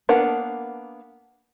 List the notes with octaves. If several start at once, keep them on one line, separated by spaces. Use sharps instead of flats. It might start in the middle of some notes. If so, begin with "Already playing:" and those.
A#3 B3 D4 A#4 F#5